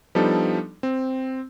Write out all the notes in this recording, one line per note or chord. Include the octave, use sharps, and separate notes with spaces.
F3 G3 B3 D4 D#4 A4
C4